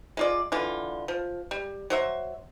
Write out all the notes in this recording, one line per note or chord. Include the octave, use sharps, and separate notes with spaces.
G#3 F4 D5
D3 E3 F4
F3
G3
F#3 C5 E5